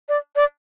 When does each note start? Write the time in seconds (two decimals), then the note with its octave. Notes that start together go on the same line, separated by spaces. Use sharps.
0.09 D5
0.36 D5